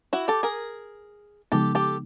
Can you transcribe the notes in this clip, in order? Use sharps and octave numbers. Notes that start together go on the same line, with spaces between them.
E4 F#4
G4 A4
G#4 A#4
C#3 F3 G#3 B3 D#4 G4 A4
G4 A4